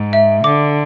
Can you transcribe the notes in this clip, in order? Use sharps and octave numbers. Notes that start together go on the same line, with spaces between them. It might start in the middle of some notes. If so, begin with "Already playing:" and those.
Already playing: G#2
E5
D3 D6